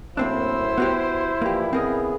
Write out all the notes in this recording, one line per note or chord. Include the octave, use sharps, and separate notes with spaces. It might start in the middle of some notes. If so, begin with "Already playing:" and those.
F#2 A2 A#3 C4 D4 E4 C5 E6
B3 F#4 G4
E3 F3 G3 A#3 G4
C#3 B3 C4 G#4 A#4 D#5